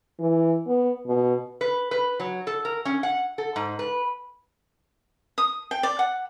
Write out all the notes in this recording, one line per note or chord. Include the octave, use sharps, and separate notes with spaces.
E3
B3
B2
B4
B4
F#3
A4
A#4
C#4
F#5
A4
G#2
B4
D#6
G5
D5
F#5